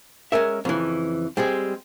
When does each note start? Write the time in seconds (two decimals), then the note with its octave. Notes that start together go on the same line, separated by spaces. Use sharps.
0.32 G#3 C#4 A#4 E5
0.65 F2 C#3 E3
1.37 G3 G#3 C4 G#4